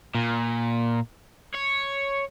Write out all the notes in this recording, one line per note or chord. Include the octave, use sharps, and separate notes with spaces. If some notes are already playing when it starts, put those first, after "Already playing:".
A#2
C#5